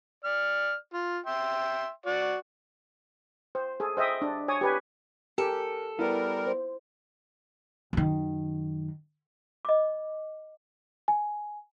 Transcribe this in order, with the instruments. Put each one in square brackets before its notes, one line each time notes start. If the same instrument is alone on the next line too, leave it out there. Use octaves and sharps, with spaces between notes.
[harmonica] D5 F6
F4
E5 G5 C6
F#4 D5
[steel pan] C5
G#4 A4
C5 D#5 E5 G5 D#6
D4
C#5 G#5 D#6
G4 B4 G#5
[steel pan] G4 G#5 [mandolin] A4 [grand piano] A#4
[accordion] G3 A#4 [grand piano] B3 [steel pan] E4
[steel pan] C5
[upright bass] F#2 D#3
[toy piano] D#5 D6
[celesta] G#5